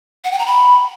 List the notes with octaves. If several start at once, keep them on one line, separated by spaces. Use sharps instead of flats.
F#5
G5
A#5
B5